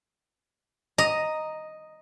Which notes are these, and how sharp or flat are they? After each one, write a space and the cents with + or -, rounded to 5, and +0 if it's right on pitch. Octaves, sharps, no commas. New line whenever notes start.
D#5 +0 A#5 +0